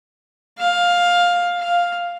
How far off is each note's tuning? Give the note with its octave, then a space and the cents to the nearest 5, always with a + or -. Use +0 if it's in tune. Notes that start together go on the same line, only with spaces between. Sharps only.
F5 +10
F5 +5